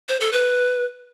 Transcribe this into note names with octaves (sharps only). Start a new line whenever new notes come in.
C5
A4
B4